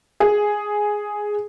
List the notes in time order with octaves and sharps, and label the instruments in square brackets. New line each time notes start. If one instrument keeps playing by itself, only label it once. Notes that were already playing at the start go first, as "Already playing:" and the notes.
[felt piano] G#4